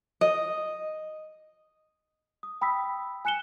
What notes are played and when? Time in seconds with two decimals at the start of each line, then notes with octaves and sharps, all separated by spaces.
0.21 D#5
2.43 D#6
2.61 G5 B5 D#6 E6 B6
3.25 G#5 F#6 C#7 E7 G7